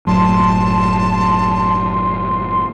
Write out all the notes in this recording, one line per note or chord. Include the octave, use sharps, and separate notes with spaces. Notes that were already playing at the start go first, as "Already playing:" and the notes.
F#1 A2 F#3 A5 C6